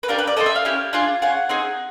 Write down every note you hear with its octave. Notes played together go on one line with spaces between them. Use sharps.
B4
A#3 D4 G4 A#4
B4
D5
C4 E4 A4 D#5
E5
F5
C#4 E4 G4
D4 F4 G#4
C#4 F4 G#4 F#5
C4 D#4 G#4